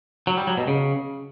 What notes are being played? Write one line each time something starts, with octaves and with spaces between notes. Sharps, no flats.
F#3
G3
F#3
B2
C#3